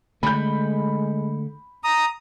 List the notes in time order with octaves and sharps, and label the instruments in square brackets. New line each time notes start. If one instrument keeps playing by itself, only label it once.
[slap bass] D3 A3 [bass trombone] G#3 [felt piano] B5 G6
[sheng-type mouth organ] A#5 D#6